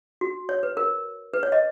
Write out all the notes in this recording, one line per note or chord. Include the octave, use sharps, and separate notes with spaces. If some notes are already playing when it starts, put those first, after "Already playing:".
F#4
C#5
B4
A#4
B4
C#5
D#5